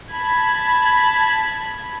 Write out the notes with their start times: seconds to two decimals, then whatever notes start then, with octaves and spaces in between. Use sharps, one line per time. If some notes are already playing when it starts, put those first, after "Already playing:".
0.12 A5 B5 G#6